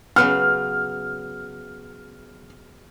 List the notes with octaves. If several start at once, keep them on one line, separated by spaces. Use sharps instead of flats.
C#3 F#3 B3 F6